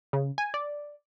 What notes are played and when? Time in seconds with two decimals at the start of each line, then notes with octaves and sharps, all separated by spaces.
0.13 C#3
0.38 G#5
0.54 D5